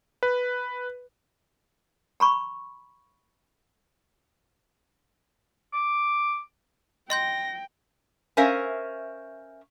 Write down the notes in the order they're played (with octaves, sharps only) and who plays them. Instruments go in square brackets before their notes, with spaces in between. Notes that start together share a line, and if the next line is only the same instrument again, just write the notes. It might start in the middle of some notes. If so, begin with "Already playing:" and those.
[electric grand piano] B4
[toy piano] A#5 B5 C#6
[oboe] D6
[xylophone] D#5 C6 G6 [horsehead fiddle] G5 [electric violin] A#6
[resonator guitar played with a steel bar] C#4 A#4 C5 E5 F5 G#5